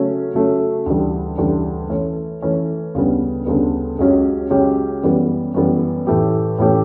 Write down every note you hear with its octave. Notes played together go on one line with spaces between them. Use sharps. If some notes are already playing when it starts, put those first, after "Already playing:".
Already playing: C#3 F#3 A3 C#4
C#3 F#3 A3 C#4
D2 C#3 E3 G3
D2 C#3 E3 G3
E3 A3 C#4
E3 A3 C#4
D2 C#3 G3 B3
D2 C#3 G3 B3
C#2 C#3 F#3 C#4 G4
C#2 C#3 F#3 C#4 G4
F#2 E3 G3 B3
F#2 E3 G3 B3
A2 E3 A3 C#4 G4
A2 E3 A3 C#4 G4